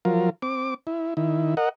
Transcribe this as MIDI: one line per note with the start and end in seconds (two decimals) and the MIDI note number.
0.05 0.30 53
0.05 0.30 54
0.05 0.30 65
0.05 0.30 70
0.42 0.74 60
0.42 0.74 86
0.87 1.14 64
1.17 1.55 51
1.17 1.55 64
1.57 1.69 70
1.57 1.69 75
1.57 1.69 78